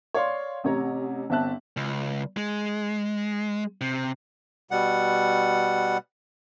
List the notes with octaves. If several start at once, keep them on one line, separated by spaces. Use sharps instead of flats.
C#5 D5 F5 C6
A1 C3 C#5 A#5
G1 C4 E5 A5 F#6
C#2
G#3
C3
B2 G3 F#5